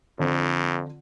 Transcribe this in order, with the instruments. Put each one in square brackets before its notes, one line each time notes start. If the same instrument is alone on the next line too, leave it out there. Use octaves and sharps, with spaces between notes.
[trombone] F2 [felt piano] D3 C4 F4